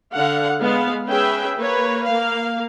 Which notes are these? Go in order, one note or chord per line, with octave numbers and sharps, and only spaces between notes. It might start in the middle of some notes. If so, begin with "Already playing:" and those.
D3 F5 F#5
G#3 B3 F5
C#4 G#4 B4 E5 G5
A#3 B4 C#5
A#3 F5